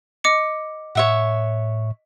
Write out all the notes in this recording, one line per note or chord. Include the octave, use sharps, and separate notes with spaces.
D#5 D6 C#7
A2 C#5 E5 F#5